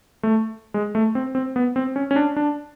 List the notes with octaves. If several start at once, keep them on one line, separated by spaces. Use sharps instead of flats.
A3
G#3
A3
C4
C4
B3
C4
C#4
C#4
D4
D4